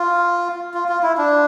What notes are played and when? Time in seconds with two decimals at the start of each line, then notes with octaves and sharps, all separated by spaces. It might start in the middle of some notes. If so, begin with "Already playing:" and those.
Already playing: F4
0.74 F4
0.89 F4
1.03 E4
1.18 D4